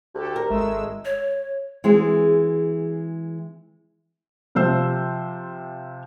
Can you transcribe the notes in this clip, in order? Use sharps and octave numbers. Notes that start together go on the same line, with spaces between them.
D2 G4 A4
A#4
G#1 G#3 A3 E6
C#5
E3 G#3 C4 F#4 G#4
C3 F3 C5 E6